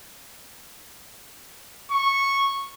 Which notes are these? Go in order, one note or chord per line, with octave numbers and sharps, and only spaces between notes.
C#6